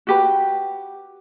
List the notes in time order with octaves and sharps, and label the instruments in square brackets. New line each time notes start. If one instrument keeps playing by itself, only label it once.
[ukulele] F#4 G4 B4